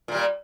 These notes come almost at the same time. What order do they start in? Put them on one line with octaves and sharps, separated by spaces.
A#2 A#3 G3